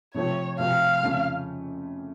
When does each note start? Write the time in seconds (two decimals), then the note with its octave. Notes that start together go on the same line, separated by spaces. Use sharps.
0.14 C3 F3 A3 C4 C#5
0.59 C3 F3 A3 C4 F5
1.03 F2 C#3 F3 A3 C#4